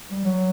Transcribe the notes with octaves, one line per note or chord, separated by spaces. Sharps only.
G3
F#3